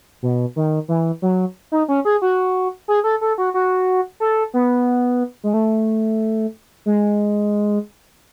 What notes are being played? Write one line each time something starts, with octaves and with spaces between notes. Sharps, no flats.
B2
D#3
E3
F#3
D#4
C#4
G#4
F#4
G#4
A4
A4
F#4
F#4
A4
B3
G#3
A3
G#3